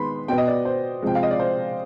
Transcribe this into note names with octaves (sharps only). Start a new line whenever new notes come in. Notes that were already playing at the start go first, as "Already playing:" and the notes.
Already playing: D#3 G#3 B3 B5 C6
B2 B3 G5
D#5
D5
C5
C3 F3 G#3 G5
F5
D#5
D5
C5